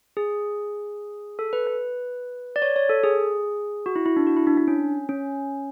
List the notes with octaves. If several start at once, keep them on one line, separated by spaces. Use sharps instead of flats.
G#4
A4
B4
B4
D5
C#5
C#5
A4
G#4
F#4
E4
E4
D4
F#4
E4
D4
D4
C#4
C#4